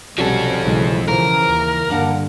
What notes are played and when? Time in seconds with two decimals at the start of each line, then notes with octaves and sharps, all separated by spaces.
0.18 B1 C3 F3 G3 C#4 F#4 A4
0.63 B1 C#3 E3 F#3 G#3
1.08 C#3 E3 F3 A#4
1.48 D#2
1.90 G2 D3 A#3 D4 F#5